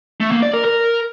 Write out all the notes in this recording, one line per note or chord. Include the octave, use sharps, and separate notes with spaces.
A3
A#3
D5
A#4
A#4